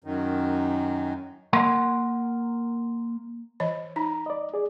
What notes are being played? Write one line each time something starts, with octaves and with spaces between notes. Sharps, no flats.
F#2 D#3
A#3 A#4 F#5 C6
E3 C#5 D#5
D#4 A#5 B5
D5 D#5
G#4 D5